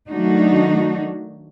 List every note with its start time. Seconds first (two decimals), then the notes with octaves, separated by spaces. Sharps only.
0.10 D#3 F#3 A3 D4 D#4 F#4